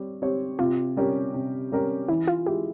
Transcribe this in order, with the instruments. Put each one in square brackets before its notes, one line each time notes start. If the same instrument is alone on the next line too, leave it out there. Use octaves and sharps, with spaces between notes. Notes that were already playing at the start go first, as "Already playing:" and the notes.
Already playing: [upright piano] G3 C4 C#5
C4 G4 C#5
[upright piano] C3 [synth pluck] F4
[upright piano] G3 C#4 G4 A#4
C3
G3 C#4 G4 A#4
[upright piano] E3 [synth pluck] E4
[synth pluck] F4
[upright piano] G#3 E4 [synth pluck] G4